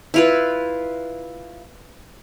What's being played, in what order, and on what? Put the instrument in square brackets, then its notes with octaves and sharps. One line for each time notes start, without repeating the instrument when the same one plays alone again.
[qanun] E4 F4 B4